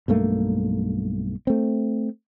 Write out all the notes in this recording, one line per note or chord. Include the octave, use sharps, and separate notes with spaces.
B1 G2 A3 A#3
A3 C4